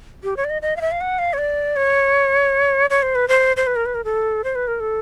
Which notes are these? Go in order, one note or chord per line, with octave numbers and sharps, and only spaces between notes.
G4
C#5
D5
D#5
D#5
F5
E5
F5
F#5
F5
C#5
D5
C#5
C#5
C5
B4
C5
C5
B4
A#4
B4
A#4
A4
C5
B4
A#4
A4